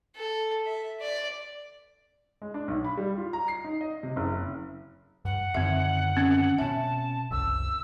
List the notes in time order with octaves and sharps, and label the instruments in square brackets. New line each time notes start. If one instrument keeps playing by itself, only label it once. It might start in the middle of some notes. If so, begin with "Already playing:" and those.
[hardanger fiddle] A4
E5
D5
[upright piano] G#3
D4
B1
B5
G3
F4
A#5
C7
D#4
D#5
C3
F#1
[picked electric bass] G2 [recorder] F#5
[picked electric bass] F#2 D3 D#3 [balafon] C4 E5
[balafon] C4 C#4
[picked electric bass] B2 C#4 [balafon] E5 [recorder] A5
[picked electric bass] F#1 C2 [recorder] E6